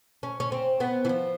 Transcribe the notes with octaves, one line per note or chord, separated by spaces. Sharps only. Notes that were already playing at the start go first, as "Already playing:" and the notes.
C#4
C#4
C4
B3
E3
F3